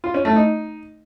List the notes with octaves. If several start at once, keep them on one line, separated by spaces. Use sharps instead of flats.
F4
C#4
A3
D#4